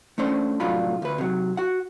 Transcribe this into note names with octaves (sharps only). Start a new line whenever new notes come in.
A3 C#4 D4 C5
C2 A2 F#3 D4 F4 B5
D2 B4
C3 F#3
F#4 F#5